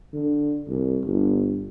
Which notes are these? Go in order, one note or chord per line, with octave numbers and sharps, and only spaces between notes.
D3
C2
G1